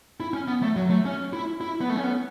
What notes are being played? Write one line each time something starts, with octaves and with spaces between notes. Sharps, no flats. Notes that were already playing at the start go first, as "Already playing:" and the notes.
E4
C#4
B3
A3
F#3
A3
C#4
E4
E4
B3
A3
C#4
B3